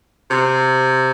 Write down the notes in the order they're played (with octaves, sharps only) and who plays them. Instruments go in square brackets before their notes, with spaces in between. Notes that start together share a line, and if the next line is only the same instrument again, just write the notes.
[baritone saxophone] C3